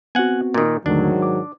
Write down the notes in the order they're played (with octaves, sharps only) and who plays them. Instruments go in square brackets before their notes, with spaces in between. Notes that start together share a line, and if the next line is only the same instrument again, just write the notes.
[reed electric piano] B3 C4 F#4 [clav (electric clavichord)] F#5 G#5
[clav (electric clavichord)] A#2 D#3
[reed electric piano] D#2 D3 A3 [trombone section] G#2 D#3 F#3 [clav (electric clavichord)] D4
[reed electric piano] D6